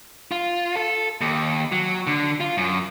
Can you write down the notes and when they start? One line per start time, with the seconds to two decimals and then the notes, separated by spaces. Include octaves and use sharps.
0.31 F4
0.76 A4
1.21 D#2
1.72 F#3
2.07 D3
2.40 F4
2.57 F#2